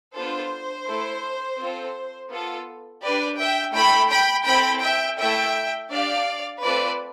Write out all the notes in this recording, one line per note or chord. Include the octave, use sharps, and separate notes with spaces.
B3 D4 F4 A4 C5
A3 E4 A4
C4 F4 A4
B3 F4 A4
D4 G4 B4 D5
E5 G5
A3 E4 A4 G5 B5
G5 B5
C4 E4 A4 G5 B5
E5 G5
A3 E4 A4 E5 G5
D4 G4 D5 F5
A3 C4 F4 A4 B4 D5